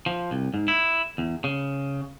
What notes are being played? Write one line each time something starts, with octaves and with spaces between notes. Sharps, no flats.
F3
C2
G#2
E4
E2
C#3